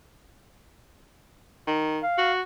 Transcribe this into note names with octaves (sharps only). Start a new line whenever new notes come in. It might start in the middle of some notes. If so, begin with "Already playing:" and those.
D#3
F5
F#4